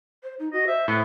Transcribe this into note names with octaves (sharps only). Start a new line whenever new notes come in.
C5
D#4
F#4 D#5
C5 E5
A2 B3